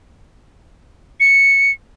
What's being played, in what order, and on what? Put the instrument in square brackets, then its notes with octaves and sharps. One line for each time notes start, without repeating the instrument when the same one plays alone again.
[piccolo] C#7